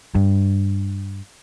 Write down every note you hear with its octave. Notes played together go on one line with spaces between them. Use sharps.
G2